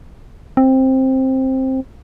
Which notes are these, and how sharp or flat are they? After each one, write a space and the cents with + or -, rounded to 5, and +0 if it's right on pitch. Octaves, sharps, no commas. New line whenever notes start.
C4 +10